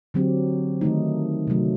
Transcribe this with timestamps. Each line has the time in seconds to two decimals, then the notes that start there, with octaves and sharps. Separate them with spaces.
0.14 D3 F#3 C4 G4
0.81 D#3 A3 D#4
1.47 C3 F#3 A3